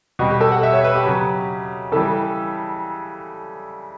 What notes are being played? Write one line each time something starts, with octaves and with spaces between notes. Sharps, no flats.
B2 G3 F#4
G4
A4
F#5
E5
C#5
B4
G4
C#3 F#3
C#3 E3 G3 A4